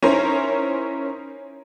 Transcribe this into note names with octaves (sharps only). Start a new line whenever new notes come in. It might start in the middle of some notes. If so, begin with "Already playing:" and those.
C#4 D#4 E4 A#4 C5